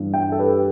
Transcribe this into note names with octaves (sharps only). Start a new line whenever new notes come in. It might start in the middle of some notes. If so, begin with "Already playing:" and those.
Already playing: G2 E3 B3
E5 G5
A4
G4 B4